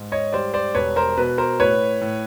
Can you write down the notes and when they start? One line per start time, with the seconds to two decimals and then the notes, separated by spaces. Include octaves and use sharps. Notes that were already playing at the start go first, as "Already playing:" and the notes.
Already playing: G#2
0.12 C#5 D#5
0.33 G3 C5 D5
0.54 C5 D5
0.75 E1 B4 C#5
0.96 A#4 C5
1.17 B2 B4
1.38 A#4 C5
1.60 A2 B4 C#5
2.01 A2